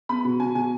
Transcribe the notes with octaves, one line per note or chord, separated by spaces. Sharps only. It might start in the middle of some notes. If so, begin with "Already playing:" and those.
B3 B5
B2
B2 G#5
B2 G#5